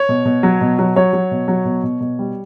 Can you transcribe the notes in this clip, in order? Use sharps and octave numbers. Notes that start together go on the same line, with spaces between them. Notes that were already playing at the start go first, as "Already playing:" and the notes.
Already playing: C#5
B2
B2
F#3
B2
F#3
F#3 C#5
F#3
B2
F#3
B2
B2
B2
G3